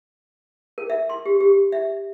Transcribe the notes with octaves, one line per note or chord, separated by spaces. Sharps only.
A#4
E5
C6
G4
G4
E5